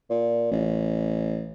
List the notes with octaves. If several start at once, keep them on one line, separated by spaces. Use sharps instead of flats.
A#2
A1